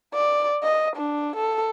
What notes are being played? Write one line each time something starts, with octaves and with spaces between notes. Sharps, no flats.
D5
D#5
D4
A4